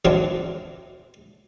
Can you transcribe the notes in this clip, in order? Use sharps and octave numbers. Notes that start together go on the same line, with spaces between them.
F#2 D#3 E3 F#3 C4 D4